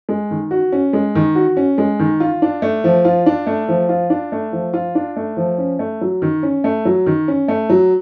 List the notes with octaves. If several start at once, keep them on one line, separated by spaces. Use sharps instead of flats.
G#3
D#3
F#4
C#4
G#3
D#3
F#4
C#4
G#3
D#3
F4
D4
A3
F3
F4
D4
A3
F3
F4
D4
A3
F3
F4
D4
A3
F3
C#4
A3
F#3
D#3
C#4
A3
F#3
D#3
C#4
A3
F#3